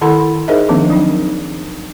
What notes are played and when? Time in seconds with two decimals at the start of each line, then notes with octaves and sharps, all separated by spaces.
0.01 D#3 E4 A4 F#5 B5 C6
0.48 D#4 G#4 A#4 C5 D#5 E5
0.69 D#3 F3 A#3 C4 D4
0.90 F#3 D#4